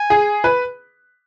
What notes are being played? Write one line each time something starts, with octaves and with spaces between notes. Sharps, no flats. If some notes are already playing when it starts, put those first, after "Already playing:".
Already playing: G#5
G#4
B4